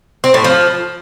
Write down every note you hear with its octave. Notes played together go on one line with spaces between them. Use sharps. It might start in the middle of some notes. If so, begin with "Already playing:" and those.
C4
A2
F3